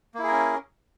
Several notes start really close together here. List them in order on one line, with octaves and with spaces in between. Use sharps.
A#3 E4 G#4 A#4 C#4